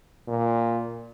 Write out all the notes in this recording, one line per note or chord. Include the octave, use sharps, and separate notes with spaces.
A#2